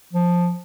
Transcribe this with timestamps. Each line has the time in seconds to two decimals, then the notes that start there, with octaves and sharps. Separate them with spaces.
0.13 F3